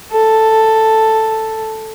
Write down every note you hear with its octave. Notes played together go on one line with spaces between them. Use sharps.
A4